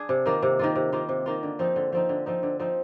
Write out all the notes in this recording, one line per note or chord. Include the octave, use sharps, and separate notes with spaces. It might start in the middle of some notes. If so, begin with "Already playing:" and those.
Already playing: D4 G#4
C3
D#3 A#3 F4
C3
D#3 A#3 F4
C3
D#3 A#3 F4
C3
D#3 A#3 F4
D3
F3 C4 D#4
D3
F3 C4 D#4
D3
F3 C4 D#4
D3
F3 C4 D#4